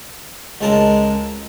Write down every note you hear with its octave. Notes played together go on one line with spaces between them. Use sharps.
C#2 G#3 A4 A#4